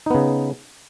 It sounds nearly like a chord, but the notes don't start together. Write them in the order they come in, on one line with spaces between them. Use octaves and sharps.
D#4 B3 C#3